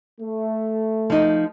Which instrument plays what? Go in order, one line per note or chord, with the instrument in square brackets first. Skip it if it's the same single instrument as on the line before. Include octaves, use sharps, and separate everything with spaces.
[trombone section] A3
[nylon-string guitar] F3 D#4